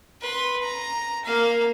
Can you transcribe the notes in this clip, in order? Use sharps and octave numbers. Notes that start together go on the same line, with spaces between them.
B4 C6
A#5
A#3 F5